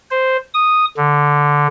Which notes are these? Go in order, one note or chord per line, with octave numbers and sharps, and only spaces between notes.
C5
D#6
D3